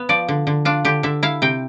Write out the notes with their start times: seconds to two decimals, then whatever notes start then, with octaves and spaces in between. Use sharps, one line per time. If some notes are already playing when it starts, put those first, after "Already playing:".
Already playing: B3
0.09 F3 D5
0.28 D3
0.47 D3
0.65 D4 F4
0.85 D3 G4
1.03 D3 E5
1.23 E4 F5
1.42 C3 G5